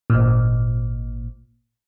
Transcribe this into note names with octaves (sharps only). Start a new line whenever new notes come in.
G#1 A#2